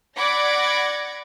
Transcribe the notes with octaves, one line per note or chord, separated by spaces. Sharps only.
D5 F#5 B5 D6 G#6 A#6